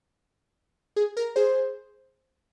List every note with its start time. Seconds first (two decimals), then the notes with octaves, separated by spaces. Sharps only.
0.96 G#4
1.17 A#4
1.36 G#4 C5